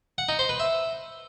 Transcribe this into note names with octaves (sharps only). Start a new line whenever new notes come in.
F#5
D#4
C5
B4
E5